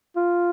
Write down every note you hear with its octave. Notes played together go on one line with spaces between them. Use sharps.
F4